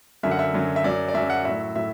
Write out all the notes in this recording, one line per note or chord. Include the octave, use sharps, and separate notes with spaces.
F#2 D3 F#3 E5
F#5
E5
F#2 D3 F#3
E5
F#2 F#3 D5
D5
F#2 F#3 E5
F#5
A2 F#3 E5
A2 F#3 E5